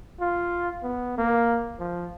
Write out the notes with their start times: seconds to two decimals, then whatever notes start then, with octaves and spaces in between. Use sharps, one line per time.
0.20 F4
0.83 B3
1.18 A#3
1.79 F3